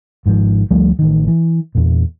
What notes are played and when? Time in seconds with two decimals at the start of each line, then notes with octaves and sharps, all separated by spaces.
0.26 G#1 G#2 C3 F3
0.71 D2 F3 G3 A3
0.99 A1 D#3
1.27 E3
1.75 E2 A#2